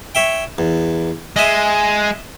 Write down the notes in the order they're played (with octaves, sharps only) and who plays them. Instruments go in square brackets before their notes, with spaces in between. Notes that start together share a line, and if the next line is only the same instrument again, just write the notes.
[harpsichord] C#5 E5 G5
E2
[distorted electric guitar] G#3 [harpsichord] D#5 E5